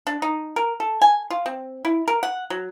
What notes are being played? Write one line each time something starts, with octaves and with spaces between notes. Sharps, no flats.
D4
D#4
A#4
A4
G#5
F4
C4
E4
A#4
F#5
F#3